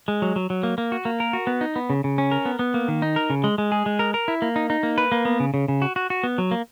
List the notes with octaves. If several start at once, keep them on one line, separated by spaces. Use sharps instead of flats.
G#3
F#3
F#3
F#3
A#3
A#3
F#4
A#3
A#4
F#4
B3
D#4
B3
C#3
C#3
C#4
A#4
B3
B3
A#3
D#3
D#4
A#4
C#3
G#3
G#3
G#4
G#3
A#4
A#4
E4
A#3
D#4
D#4
A#3
B4
A#3
B3
C#3
C#3
C#3
F#4
F#4
F#4
B3
F#3
A#3